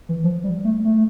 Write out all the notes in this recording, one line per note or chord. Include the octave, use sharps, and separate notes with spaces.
E3
F3
G3
A3
A3